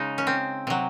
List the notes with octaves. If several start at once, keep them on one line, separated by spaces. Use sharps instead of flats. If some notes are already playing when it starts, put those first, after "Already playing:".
Already playing: C#3 G#3 D#4
C#4
C4
C3 F#3